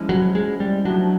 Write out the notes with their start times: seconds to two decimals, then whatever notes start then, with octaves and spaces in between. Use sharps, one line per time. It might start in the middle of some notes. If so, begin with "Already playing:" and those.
Already playing: F3 G#3 C#4 E4
0.09 F#3
0.35 G#3
0.60 G3
0.85 F3 F#3 A3 D4